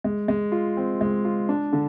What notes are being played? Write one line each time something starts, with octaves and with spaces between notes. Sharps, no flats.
G#3
G#3
F4
C4
G#3
F4
D4
D3